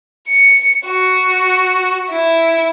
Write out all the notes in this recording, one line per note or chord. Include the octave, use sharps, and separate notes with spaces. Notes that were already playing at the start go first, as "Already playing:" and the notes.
C#7
F#4
E4